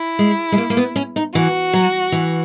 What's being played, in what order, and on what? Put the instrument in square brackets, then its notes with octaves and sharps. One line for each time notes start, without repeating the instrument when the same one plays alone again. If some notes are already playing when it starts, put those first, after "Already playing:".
Already playing: [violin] E4
[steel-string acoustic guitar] G#3
G#3
A#3
A#3
B3
C#4
D#4
[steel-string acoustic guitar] E3 [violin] F#4
[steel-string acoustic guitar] F#3
E3